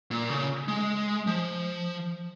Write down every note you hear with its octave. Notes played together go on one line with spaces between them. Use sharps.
A#2
C#3
G#3
F3